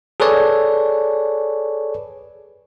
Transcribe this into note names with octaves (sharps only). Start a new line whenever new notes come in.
G#4 A4 B4 C#5 D5